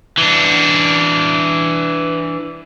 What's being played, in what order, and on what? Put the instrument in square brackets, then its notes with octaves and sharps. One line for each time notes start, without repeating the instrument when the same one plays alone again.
[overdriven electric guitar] E3 D4